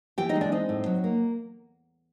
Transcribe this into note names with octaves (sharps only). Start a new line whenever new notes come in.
E3 G4 G5
D#4 D#5
G#3
D4 D5
C4 D#4 D#5
A2
F#3
A#3